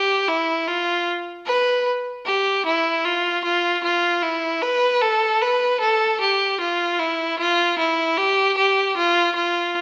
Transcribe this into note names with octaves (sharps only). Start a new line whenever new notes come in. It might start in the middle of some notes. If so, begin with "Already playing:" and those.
Already playing: G4
E4
F4
B4
G4
E4
F4
F4
F4
E4
B4
A4
B4
A4
G4
F4
E4
F4
E4
G4
G4
F4
F4